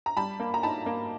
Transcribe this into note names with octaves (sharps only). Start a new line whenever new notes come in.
A#5
G3 A5 B5
A#3
A#5
D#4 A5 B5
A#3